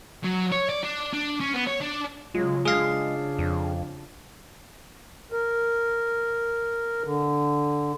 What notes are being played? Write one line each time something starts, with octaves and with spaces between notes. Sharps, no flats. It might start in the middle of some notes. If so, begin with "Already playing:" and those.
F#3
C#5
D5
D4
D4
C#4
B3
C#5
D4
C#3 F#3 G#3 F4
C#3 G#3 D4 G#4 F5
F2
A#4
D3